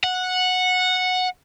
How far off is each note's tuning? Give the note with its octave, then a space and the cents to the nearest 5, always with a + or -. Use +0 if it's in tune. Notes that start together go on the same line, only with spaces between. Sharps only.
F#5 -10